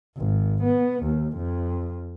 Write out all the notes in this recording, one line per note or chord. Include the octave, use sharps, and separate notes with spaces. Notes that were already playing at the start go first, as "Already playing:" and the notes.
G#1
B3
D#2
F2